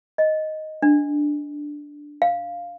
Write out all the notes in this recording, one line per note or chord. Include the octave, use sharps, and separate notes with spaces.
D#5
D4
F5